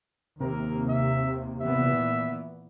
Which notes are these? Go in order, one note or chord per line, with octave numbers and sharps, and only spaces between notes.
D#2 C3 A#3 A#4
E5
A#2 E3 B3 E5